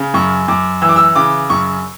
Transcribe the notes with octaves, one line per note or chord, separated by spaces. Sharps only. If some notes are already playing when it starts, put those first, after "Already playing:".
Already playing: C#3
F#2 C#6
F#2 D6
E3 E6
D6
E6
C#3 D6
F#2 C#6